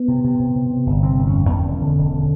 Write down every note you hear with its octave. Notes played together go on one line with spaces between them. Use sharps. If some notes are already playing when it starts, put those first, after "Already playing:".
Already playing: B3
C3
C3
C3
C3
C3
G1
C3 C4
G1
C#4
F2
D#2
E1
D3
E1
D3